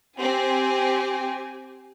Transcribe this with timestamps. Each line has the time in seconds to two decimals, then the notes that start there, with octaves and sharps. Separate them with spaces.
0.20 C4 G4 G#5